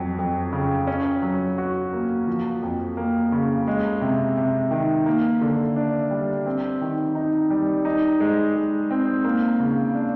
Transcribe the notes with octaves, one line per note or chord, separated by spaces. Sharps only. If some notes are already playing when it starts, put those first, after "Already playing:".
Already playing: F2 F#3
F2
C#3
C#4
F#3
F#4
A#3
F3
F2
A#3
C#3
G#3
C3
C3
D#3
A#3
D3
D4
G3
C4
D#3
D#4
G3
D#4
G#3
G#3
C4
A#3
C#3
D4